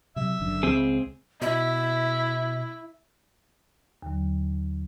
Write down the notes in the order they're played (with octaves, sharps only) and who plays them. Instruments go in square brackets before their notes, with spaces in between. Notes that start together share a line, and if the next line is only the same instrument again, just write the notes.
[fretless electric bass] C3 F#3 [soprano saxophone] E5
[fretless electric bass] F#1 F#2 D3
[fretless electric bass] C#2 [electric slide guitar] C4 G#4
[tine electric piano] B2 [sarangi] E4 [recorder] E5
[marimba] D#2 D3 F#3